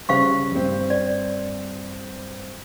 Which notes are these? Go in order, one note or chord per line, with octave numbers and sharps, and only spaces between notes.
C#3 G3 C5 F5 C#6
G2 C4
D5